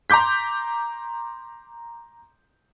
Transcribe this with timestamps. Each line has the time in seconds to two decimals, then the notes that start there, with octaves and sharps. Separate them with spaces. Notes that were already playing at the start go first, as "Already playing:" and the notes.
0.10 A#5 C6 D6 G6 B6